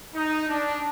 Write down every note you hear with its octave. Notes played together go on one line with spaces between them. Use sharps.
D#4
D4